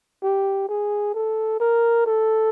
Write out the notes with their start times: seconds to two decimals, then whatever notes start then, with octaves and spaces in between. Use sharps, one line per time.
0.23 G4
0.69 G#4
1.14 A4
1.60 A#4
2.06 A4